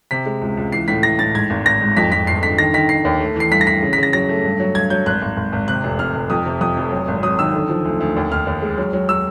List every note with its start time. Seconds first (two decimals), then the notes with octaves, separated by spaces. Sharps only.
0.11 C3 B6
0.26 G#3
0.41 C#2
0.57 C#2
0.72 E3 C7
0.88 A2 B6
1.03 E3 A#6
1.19 A2 A6
1.34 G#2 G#6
1.50 G#1
1.65 G#1 A#6
1.81 G#2
1.97 F2 B6
2.12 F2 B6
2.27 G1 C7
2.43 D3 B6
2.58 D#3 A#6
2.74 D#3 B6
2.89 D#3 C7
3.05 D#2
3.20 A3
3.36 E3 C7
3.51 G2 B6
3.61 A#6
3.67 E3 B6
3.82 C#3
3.93 B6
3.98 C#3
4.03 A#6
4.13 F#3 A#6
4.29 A3
4.44 G2
4.60 F#3
4.75 G2 G#6
4.90 F#3 G6
5.06 G#1 F#6
5.22 G#1
5.37 G#1
5.53 G#1
5.68 C3 F#6
5.84 F1
5.99 F1 F6
6.15 F1
6.30 F2 D#6
6.46 C3
6.61 F2 D#6
6.77 F1
6.92 F#3
7.08 G#1
7.23 F#3 D#6
7.39 D#3 E6
7.54 D3
7.69 F3
7.85 D2
8.00 D2
8.16 D#2
8.32 D#2 F6
8.47 D#2
8.62 G#3
8.78 F#3
8.93 F#3
9.09 F#3 E6